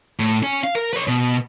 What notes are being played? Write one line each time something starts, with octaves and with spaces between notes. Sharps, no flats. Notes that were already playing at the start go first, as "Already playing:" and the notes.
A2
C#4
F5
A#4
B4 C#5
B2